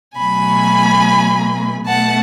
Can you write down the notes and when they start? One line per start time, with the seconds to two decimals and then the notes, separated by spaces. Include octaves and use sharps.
0.17 B2 F#3 A3 G#5 B5
1.86 B2 A3 F#5 A5